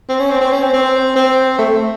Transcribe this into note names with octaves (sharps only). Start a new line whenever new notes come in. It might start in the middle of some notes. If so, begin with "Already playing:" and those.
C4
C#4
C4
C4
C#4
C4
C4
C4
A3